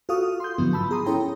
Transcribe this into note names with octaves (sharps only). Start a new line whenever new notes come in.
F4 F#4 A4 F5 C#6 D#6
C6 G6
G#2 D3 F3 F#3 B3 E4
A5 B5 E6
G#4 A#5 C6 D#6
C#4 E4 A4 C#5 G5 A#5